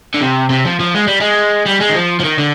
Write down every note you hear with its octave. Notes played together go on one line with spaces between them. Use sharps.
D3
C3
C3
F3
F3
G#3
G3
G#3
G3
G#3
D#3
F3
F3
D#3
D3